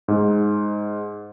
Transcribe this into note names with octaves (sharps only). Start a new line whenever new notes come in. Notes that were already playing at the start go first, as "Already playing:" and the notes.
G#2